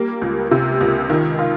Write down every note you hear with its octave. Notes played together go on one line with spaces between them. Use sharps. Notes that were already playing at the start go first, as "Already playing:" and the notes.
Already playing: G3 A#3
C#2
C3
C#2
D#3
F4